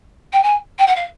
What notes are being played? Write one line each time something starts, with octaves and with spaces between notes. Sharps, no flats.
G5
G#5
G5
F#5
F5